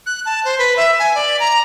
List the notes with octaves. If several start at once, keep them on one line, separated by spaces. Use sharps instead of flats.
F#6
A5
C5
B4
E5
G#5
D5
A#5